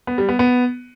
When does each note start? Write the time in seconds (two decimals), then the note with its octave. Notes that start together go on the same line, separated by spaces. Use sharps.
0.07 B3
0.18 G3
0.29 B3
0.39 B3